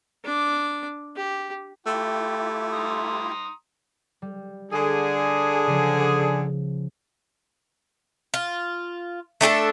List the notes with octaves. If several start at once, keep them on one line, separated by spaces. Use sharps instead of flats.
D4 D6
G4
A3 E4 F4 G4 G5
A#5 C6 D#6
G3
D3 G#4
C#3 F3
F4
A3 D4 G4 A4